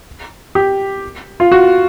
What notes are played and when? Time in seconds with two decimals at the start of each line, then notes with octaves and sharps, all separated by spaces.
0.55 G4
1.40 F4
1.52 F#4